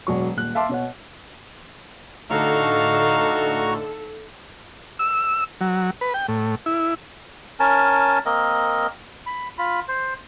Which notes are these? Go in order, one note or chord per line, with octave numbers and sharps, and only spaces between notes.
E1 F#3 C#6
D#1 F#6
E5 F5 A5 C6 D6
B2 C#5 F#5
A2 D3 D#4 F#4 A4 F5 A#5 C#6
E6
F#3
B4
G5
A2
E4
C#4 A#4 G#5 A5
A#3 C4 A#4 D#5
B5
F4 B5
C5